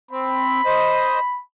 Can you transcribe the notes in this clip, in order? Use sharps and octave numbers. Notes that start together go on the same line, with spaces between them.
C4 B5
C5 D#5